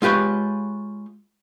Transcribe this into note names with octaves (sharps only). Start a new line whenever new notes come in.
G#3 F4 G4 B4 C#5